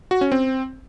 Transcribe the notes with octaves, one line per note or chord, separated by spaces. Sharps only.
F#4
C#4
C4